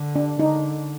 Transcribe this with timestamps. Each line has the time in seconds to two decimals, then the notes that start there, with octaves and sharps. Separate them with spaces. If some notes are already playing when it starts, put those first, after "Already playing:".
Already playing: D3
0.16 D4
0.39 D3 D#4